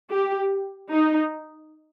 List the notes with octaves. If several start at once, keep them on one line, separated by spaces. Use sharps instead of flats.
G4
D#4